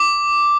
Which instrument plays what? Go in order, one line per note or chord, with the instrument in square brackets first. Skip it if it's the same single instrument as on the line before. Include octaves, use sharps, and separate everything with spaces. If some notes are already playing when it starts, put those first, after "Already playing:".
Already playing: [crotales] D6